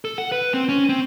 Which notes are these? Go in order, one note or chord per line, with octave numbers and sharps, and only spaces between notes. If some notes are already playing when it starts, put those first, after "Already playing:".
A4
F#5
B4
C4
C#4
C4